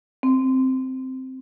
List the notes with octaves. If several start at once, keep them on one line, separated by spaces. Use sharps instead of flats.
C4